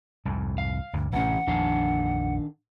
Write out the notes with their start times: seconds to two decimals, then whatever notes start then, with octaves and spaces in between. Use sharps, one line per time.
0.25 C2 F2 G#2
0.58 F5
0.93 D2 G2
1.13 A1 C3 E3 C#4 F#5
1.47 A#1 F2 D#3 D4 F5